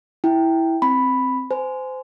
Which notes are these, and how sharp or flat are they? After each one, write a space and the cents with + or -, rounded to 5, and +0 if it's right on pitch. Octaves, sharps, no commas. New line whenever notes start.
E4 -5 G5 +0
C4 +0 B5 +0
C5 -25 G#5 +15